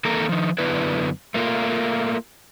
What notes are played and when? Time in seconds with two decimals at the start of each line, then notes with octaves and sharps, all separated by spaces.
0.05 E2 D#3 A#3 A4 A#4 A#5
0.29 D#3 F3
0.58 F#2 D3 B3 D4 E4 B4
1.34 A3 A#3 F4